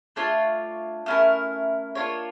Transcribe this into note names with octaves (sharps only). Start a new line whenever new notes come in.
A3 D4 F4 C#5
A3 C#4 E4 A#4
A#3 D4 F4 C#5